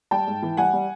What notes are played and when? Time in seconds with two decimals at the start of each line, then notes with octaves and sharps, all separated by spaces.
0.11 G3 G5 A5
0.27 G#2
0.42 E3
0.57 G3 F#5 G#5
0.73 G3